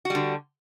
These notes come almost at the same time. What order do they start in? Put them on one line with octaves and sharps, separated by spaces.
F#4 G3 D3